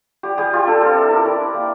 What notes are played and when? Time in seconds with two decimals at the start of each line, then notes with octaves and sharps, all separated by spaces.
0.23 G3 G4
0.38 G3 G4
0.53 G3 F4
0.67 D4 A4
0.81 C4 A4
0.96 E4
1.10 E4 A#4
1.25 E4 D5
1.40 D4
1.54 A#3